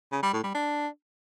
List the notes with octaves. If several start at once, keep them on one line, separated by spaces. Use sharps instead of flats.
C#3
G3
A2
G3
D4